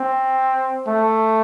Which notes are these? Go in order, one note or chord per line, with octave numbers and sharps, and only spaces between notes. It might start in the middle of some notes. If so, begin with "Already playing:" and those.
Already playing: C4
A3